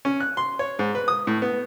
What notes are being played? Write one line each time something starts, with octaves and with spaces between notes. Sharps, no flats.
C#4
F#6
C6
C#5
G#2
B4
D#6
A2
B3